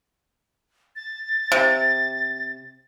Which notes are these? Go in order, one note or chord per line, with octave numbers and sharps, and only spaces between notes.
A6
C3